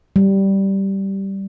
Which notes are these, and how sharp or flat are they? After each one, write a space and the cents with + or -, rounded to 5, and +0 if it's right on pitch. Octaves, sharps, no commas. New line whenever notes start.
G3 -10